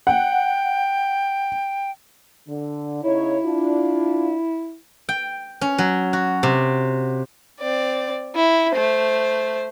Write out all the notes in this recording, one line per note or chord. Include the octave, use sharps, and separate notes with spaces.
F#5 G5
D3
C#3 D#4 E4 C#5
D4 F4
G5
C#4
F#3
F#4
C3
C4 D5
E4
A3 C5